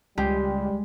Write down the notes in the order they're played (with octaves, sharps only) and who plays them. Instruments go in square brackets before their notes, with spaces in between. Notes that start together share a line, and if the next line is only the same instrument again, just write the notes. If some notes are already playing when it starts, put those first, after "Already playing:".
[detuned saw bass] C#2 [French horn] G3 [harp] G#3 [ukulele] G4